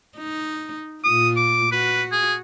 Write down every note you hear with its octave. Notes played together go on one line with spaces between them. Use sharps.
D#4
A#2 F4 D#6
D6
F#4 B4
G#4